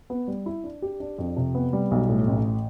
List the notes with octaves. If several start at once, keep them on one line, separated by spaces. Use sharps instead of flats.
B3
G3
E4
D4
G4
D4
F2
C3
B3
G3
B1
A2
A1